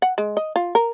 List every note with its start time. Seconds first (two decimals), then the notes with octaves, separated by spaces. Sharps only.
0.02 F#5
0.18 G#3
0.37 D#5
0.56 F4
0.75 A#4